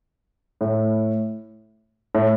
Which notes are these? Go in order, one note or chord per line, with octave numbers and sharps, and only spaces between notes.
A2
A2